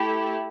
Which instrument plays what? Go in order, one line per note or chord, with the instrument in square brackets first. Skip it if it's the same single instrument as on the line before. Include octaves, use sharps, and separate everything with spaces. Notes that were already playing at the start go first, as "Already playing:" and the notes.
Already playing: [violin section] A3 E4 G4